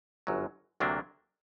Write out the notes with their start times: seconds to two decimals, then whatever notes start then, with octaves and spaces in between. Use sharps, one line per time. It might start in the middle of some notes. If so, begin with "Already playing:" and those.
0.27 G1 F#2 F#3
0.80 D2 C3 F#3 A#3 D4